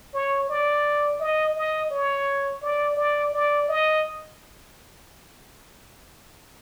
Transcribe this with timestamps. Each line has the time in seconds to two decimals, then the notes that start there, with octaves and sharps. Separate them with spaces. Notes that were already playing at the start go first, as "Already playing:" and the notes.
0.14 C#5
0.49 D5
1.20 D#5
1.55 D#5
1.91 C#5
2.62 D5
2.97 D5
3.33 D5
3.69 D#5